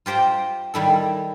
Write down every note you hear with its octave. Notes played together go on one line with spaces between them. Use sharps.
F4 G4 C5 G5 A#5
D#3 G3 E4 A4